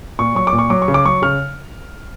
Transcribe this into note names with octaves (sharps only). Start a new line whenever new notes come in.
A#2 C#6
F#3 C#6
D6
A#2
C#6
F#3 D6
C#6
C#3
D6
F#3 C#6
C#3 F6